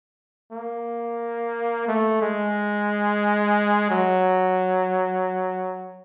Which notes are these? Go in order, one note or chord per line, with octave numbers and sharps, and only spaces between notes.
A#3
A3
G#3
F#3